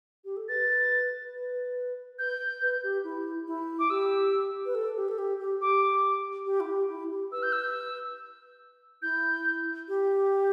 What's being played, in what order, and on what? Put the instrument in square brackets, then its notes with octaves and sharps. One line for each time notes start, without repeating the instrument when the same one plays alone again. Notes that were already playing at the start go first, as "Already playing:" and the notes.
[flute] G4
A4
[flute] B4 [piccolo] A6
[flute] B4
[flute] B4 [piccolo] G6
[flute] B4
G4
E4
E4
[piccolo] D6
[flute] G4 [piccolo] E6
[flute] B4
A4
G4
A4
G4
G4
[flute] G4 [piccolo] D6
[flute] G4
E4
G4
E4
G4
[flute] B4 [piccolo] E6
[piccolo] G6
E6
[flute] E4 [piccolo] G6
[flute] G4